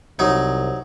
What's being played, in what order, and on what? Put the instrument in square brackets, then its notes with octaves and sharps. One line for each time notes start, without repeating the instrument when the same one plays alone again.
[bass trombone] C2 [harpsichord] F#3 D#4